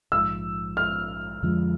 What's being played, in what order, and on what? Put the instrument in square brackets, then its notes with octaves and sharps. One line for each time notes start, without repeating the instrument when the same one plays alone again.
[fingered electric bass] A#1 G#2 F3 [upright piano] E6
[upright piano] F6
[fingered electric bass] F2 D3 F3 G#3